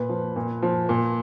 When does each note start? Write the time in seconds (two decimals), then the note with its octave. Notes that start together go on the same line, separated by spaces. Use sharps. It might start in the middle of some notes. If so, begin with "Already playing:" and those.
Already playing: A#2 B4
0.09 F3
0.36 A#2
0.62 F3
0.89 A#2